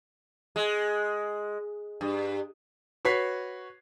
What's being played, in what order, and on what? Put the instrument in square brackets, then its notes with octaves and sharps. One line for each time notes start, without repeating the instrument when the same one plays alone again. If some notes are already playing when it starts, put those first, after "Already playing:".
[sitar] G#3
G2
[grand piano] F#4 B4 C#5 B6 C7